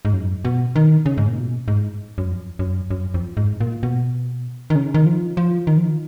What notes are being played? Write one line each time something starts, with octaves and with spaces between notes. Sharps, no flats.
G#2
F#2
B2
D#3
C#3
G#2
A#2
B2
G#2
F#2
F2
F#2
F#2
F2
G#2
A#2
B2
D#3
C#3
D#3
F3
F3
D#3
F3
D#3